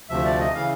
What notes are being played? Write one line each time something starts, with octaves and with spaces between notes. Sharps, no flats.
D2 C3 F3 A3 E5
D5
D#5
C#3 E3 F5